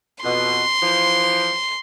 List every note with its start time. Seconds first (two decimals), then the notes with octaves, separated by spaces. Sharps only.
0.23 F2 B2 C6
0.81 E3 F3